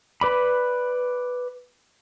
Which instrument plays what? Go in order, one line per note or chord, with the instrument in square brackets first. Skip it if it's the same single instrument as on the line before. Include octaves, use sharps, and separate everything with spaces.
[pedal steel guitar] B4 D5 B5